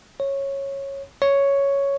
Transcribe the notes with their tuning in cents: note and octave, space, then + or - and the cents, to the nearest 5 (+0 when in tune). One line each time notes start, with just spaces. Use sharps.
C#5 -10
C#5 +5